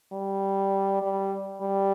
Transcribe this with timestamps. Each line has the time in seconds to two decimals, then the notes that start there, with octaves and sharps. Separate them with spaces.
0.12 G3
1.02 G3
1.61 G3